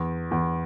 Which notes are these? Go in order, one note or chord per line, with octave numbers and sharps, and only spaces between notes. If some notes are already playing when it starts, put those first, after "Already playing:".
Already playing: E2
E2